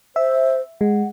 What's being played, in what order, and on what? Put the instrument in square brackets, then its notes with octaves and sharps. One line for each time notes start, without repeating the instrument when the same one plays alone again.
[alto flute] C5 [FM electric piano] E5
[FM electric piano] G#3 [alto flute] F#5